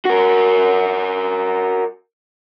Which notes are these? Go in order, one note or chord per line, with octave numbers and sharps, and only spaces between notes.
F#4 A#4